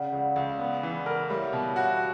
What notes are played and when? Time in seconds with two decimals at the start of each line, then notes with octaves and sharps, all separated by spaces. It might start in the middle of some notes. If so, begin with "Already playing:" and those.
Already playing: C#3 D5 F#5
0.12 C#2
0.36 C#2
0.59 B3
0.83 E3
1.06 A#4
1.29 G3 C#5 E5
1.53 B2
1.76 F#4